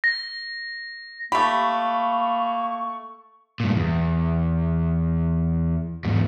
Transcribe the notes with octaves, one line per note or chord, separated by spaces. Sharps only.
A#6
A3 A#3 G4 B5 C#6
G2 A#2
E2
E2 G#2